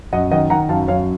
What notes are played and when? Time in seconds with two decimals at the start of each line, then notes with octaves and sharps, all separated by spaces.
0.13 F#2 D#5 F#5
0.31 D#3 D#5 F#5
0.50 D#3 F#5 A#5
0.69 F#2 F5 A5
0.88 F#2 C#5 F5